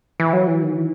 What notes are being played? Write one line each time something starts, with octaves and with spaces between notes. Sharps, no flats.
E3
F#3
E3
D#3
E3